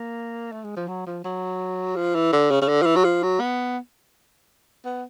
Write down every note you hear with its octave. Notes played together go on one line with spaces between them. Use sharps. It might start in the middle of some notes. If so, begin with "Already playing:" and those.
Already playing: A#3
A3
G#3
F3
F#3
F3
F#3
F3
E3
D3
C#3
C#3
D3
F3
E3
F#3
F3
F#3
B3
B3